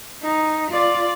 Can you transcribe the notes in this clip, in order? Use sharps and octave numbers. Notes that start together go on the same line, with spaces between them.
D#4
F4 D5